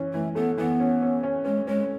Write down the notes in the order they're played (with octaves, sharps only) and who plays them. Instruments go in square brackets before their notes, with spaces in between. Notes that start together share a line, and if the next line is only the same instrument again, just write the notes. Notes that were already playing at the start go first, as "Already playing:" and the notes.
Already playing: [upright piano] E3 C#4
[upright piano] E3 [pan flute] A3
[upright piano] A3 [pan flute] B3
[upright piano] E3 [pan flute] B3
[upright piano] C#4
C#4
C#4
[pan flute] G#3 [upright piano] C#4
[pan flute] G#3 [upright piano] C#4